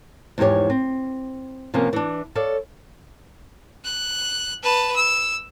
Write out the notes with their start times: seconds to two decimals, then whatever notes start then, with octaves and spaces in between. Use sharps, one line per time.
0.38 E2 G#2 F3 D#4 G4 C#5
0.70 C4
1.74 C3 F3 A#3 B3 C#4
1.93 E3 D4
2.35 A4 C#5 D5 F5
3.84 F#6
4.63 B4 A5
4.96 E6